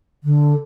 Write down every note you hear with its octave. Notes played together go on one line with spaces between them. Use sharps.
D3